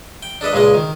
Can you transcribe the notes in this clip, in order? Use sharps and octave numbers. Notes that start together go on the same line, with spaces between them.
G5
D4 A4 B4 D#5
C#2 A#2 G#3 G#4 D#5
D#3